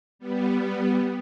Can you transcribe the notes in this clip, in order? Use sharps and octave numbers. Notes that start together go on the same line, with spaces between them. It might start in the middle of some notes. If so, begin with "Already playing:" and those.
G3 B3